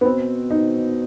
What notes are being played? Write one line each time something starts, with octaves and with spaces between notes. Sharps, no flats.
B3
B2 C4
D#4